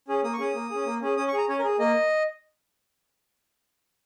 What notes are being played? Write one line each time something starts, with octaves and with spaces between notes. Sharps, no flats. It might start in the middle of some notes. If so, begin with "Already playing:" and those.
C#4 G#4
A#3 D#6
C#6
C#4 G#4 D#6
A#3
C#4 G#4
A#3
C#4 G#4
C#4 D#6
C#6
G#4 A#5
C#4 C#5
A#4
G#4
A#3 D#5